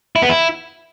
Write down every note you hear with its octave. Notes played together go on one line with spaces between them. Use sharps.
E4
B3
E4